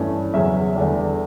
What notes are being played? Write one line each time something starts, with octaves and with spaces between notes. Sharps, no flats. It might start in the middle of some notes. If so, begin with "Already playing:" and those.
Already playing: G2 E3 A3 C#4
E2 C#3 F#3 C#4 E5
E2 D3 G3 D4